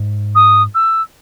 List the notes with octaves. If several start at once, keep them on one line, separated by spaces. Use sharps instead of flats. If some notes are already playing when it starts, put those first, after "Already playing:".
Already playing: G#2
D#6
E6